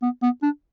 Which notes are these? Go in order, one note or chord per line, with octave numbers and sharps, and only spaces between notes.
B3
B3
D4